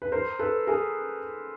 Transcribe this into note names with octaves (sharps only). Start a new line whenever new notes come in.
B4
A#4 C5
A4 B4
G#4 A#4